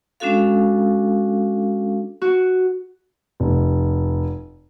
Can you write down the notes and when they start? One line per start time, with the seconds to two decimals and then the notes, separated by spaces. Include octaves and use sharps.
0.20 G#3 C#4 D4 F#4 A4 F5
2.22 F#4
3.40 F1